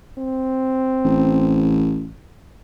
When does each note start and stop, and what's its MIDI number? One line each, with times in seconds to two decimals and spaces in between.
0.18 1.91 60
1.04 2.10 33